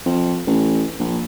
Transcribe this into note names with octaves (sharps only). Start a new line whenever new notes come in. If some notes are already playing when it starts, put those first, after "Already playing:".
F2
A1
A#1